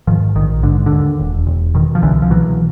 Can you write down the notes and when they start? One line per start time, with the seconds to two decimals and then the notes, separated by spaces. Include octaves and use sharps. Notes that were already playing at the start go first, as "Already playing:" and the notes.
0.07 G#2 D#3 F3
0.35 A#1 D#3
0.63 G#2 D3
0.86 D3
0.91 D#2
1.19 E1
1.47 E1
1.74 B2 D#3
1.95 F3
2.02 C2 D3 E3
2.22 F3
2.30 B2 E3 F#3